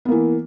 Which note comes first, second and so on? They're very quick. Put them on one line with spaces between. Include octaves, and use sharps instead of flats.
B3 A#3 E3